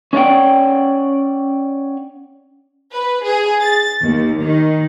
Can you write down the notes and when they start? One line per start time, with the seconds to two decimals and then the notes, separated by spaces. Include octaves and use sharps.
0.13 C#4 C#5 D5 F#5 G5
2.92 B4
3.24 G#4
3.61 A6
4.04 D#2
4.42 D#3